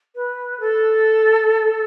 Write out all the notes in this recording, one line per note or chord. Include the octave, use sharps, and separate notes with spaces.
B4
A4